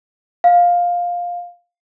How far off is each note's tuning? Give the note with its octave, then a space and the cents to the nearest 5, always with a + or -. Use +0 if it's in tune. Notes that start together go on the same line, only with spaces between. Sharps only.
F5 +10